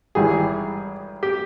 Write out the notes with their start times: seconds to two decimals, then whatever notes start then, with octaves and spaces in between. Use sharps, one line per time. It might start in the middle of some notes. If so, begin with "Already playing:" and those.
0.15 G#1 G2 E3 G3 G#4
1.23 G4